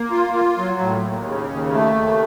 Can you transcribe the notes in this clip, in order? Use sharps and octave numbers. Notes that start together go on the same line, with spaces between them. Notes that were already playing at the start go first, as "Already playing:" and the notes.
Already playing: A#3
F4
F4
F#3
A2
D#2
C#3
D#2
A3
D#2